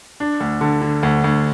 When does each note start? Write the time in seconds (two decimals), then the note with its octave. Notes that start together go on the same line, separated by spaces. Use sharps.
0.20 D4
0.40 D2
0.61 D3
0.82 D3
1.03 D2
1.24 D2